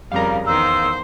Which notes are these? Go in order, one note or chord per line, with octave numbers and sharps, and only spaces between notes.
F2 C#3 G3 A#4 F5 A#5
E2 D#3 C5 E6